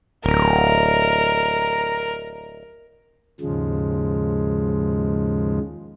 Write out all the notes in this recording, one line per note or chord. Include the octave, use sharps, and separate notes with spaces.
D1 A#4
D#2 G#2 C#3 F3 G#3